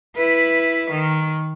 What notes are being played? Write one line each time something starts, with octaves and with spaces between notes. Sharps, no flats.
E4 B4
D#3